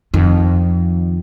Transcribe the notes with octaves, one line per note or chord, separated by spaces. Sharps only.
F2 D#3